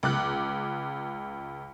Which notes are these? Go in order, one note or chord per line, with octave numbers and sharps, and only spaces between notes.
C#2 D6 F#6